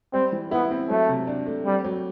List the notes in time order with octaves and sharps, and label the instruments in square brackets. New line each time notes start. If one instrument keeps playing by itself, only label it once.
[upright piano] G3 [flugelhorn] C4
[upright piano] E3
[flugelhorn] B3 [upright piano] E4
[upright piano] C4
[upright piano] F#3 [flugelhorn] A3
[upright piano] C3
D4
A3
[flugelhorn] G3 [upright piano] C4
[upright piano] F#3